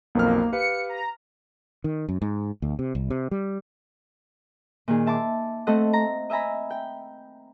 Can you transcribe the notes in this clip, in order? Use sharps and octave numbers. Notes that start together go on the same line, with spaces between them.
B1 F2 A#3 F6
G4 B4 F5 C#7
A#5
D#3
F#2
G#2
D2
C3
C2
C3
G3
A#2 D#3 G#4
E5 A5 C6 D6
A3 C4 A4 C5 D#5 F#5
A#5
D#5 E5 G#5 A#5 B5
G5